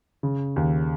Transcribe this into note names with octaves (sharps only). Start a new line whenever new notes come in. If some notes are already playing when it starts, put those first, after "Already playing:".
C#3
D#2